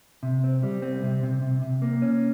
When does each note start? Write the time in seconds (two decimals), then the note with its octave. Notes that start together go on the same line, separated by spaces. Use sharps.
0.23 C3
0.44 C4
0.63 G3
0.82 C4
1.03 C3
1.23 C3
1.42 C3
1.62 C3
1.82 A#3
2.02 C#4